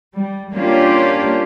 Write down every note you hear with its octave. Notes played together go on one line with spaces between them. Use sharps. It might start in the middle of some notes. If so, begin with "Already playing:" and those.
G3
G3 A#3 C#4 D4 F4 G4